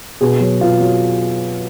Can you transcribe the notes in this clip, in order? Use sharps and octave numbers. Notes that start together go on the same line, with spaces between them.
B2 G#4
F#3
B2 F4
F#3